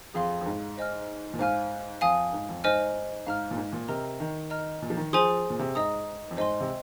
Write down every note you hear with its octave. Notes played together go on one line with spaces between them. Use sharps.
F2 G#4 F5 C6
F2
G#2
C5 D#5 G#5 F6
A#2
G#2 C5 F5 G#5 F6
F2 F5 G#5 D#6
G#2
F2
G#2 C5 D#5 G#5 F6
G#2 F5 A#5 F6
A#2
G#2
A#2
C3 A#4 D#5 A#5 F6
D#3
D#5 A#5 F6
A#2
F3
D#3
F3 G#4 C5 G#5 C6 D#6
A#2
C3
G#2 D#5 A#5 D#6
F2
G#2 C5 D#5 G#5 C6
C3